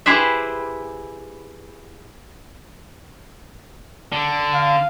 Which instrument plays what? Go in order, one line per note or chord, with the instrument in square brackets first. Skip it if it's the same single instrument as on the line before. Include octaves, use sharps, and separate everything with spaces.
[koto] E4 G4 G#4 B4 C5 E5
[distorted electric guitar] D3
[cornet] F5